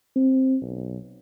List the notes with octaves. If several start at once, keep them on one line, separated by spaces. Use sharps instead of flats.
C4
B1